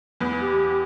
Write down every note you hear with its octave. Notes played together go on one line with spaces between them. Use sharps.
E2 B3
G4